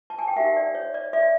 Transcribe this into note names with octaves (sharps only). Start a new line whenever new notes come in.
A5
G#5
G5
D#4 G4 A#4 E5 F#5
D5
C#5
D5
D5 E5